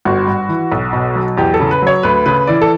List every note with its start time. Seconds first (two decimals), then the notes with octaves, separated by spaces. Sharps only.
0.05 G1 F#4
0.27 G2
0.49 E3
0.72 B1
0.93 B2
1.15 F#3
1.37 E2 G4
1.54 A4
1.60 C#3
1.71 B4
1.82 F#3 C#5
2.03 D2 B4
2.26 C#3 B4
2.47 E3 D5
2.62 A4